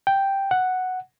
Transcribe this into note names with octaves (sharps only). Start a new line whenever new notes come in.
G5
F#5